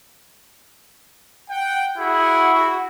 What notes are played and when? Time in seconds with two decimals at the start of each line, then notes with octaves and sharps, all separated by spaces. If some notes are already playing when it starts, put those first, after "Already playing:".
1.50 F#5 G5
1.98 E4 F#4 G#4 F#5
2.53 F#4